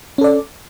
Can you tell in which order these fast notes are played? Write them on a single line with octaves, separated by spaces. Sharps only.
C#4 A4 D5